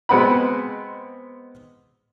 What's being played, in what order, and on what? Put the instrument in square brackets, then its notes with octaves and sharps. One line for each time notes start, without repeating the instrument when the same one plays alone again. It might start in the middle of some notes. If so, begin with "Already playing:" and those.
[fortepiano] B2 G#3 B3 C4 F#5 B5